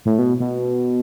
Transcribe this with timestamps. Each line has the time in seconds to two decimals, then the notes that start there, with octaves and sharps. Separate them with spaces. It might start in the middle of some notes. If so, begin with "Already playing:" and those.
0.05 A2
0.19 B2
0.40 B2